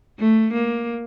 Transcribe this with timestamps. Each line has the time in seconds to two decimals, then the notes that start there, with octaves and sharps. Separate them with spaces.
0.20 A3
0.53 A#3